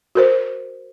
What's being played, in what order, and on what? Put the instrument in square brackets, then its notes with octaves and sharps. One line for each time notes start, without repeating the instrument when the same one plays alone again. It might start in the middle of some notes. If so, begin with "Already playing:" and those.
[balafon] F#4 A#4 C5